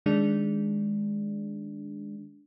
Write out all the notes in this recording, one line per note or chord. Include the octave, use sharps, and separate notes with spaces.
D#3 G#3 D4